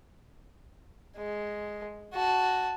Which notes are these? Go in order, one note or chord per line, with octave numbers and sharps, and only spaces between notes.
G#3
F#4 A5